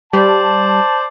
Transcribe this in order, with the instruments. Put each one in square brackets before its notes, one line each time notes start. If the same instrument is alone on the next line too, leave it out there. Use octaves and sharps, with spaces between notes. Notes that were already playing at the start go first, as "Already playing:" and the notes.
[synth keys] G3 [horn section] C5 D5 A5